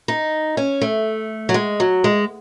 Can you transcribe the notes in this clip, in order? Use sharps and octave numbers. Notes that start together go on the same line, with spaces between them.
D#4
C#4
A3
F#3
G#3
F#3
G#3